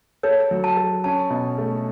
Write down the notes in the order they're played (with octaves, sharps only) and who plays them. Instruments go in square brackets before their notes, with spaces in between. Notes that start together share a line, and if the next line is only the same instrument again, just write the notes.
[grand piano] A4 [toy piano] C#5
[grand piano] F#3
[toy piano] A5
[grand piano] A4
[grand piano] C#4 [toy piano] A5
[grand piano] B2
A3